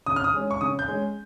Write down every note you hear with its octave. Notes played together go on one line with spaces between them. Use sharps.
C#3 D#6
F6
D#6
G#3 C#4
C#6
C#3 D#6
G6
G#3 C#4